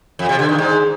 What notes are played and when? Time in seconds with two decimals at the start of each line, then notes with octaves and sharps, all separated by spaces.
0.19 F2
0.29 C3
0.39 D3
0.49 D#3
0.58 G#2